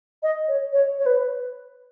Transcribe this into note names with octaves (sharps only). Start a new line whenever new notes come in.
D#5
C#5
C#5
C#5
B4